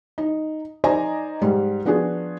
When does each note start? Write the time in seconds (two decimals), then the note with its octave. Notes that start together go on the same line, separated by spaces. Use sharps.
0.18 D#4
0.84 D#4 C5 D5 D#5 G#5 A#5
1.42 G#2 G3
1.85 F3 B3 D4 F#4 G#4